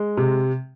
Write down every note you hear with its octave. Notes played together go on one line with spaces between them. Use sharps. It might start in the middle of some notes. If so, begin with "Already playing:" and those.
Already playing: G#3
C3